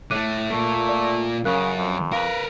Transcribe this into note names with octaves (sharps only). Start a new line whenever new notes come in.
A2 A3 D6 F#6 D#7
A#2 A3
D5
F#2 C#3 A#4 F5 F#6
F2
A#4 B4 F5